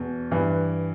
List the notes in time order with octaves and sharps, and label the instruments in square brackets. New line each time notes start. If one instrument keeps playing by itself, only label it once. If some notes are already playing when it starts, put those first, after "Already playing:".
Already playing: [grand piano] E2 B2
G2 E3